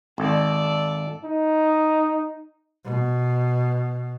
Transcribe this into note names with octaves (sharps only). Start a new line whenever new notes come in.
G#1 A4 D5
D#4
B2